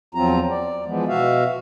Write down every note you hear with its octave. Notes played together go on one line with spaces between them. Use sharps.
E2 F3 F#3 C4 F4 A#5
D5
E3 F3 G#3 B3
B2 F#4 E5 F5